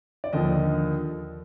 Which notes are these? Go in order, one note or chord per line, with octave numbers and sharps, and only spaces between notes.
D5
D#2 D3 F3 D#5